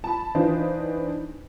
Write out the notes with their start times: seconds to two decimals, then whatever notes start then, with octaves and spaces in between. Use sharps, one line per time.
0.04 A5 B5
0.35 E3 D4 D#4 F4 B4 C5